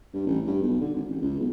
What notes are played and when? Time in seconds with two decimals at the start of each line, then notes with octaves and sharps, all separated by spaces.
0.13 G2
0.26 A1
0.46 G2
0.61 B1
0.80 D3
0.95 G#1
1.09 A1
1.21 C#2
1.39 B1